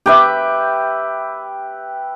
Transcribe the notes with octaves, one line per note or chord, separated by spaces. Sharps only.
G4 B4 E5